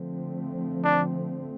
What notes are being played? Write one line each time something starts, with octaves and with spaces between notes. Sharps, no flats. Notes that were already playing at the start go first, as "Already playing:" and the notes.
Already playing: D3 F3 A3 C4
D4